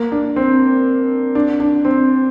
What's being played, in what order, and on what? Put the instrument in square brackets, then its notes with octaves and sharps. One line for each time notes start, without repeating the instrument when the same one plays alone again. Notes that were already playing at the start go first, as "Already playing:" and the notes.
Already playing: [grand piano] A#3
D4
C4
D4
D4
C4